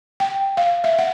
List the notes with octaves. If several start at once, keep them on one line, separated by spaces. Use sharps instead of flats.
G5
F5
E5
F#5